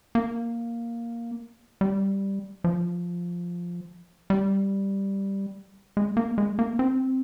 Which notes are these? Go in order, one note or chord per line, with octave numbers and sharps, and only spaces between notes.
A#3
G3
F3
G3
G#3
A#3
G#3
A#3
C4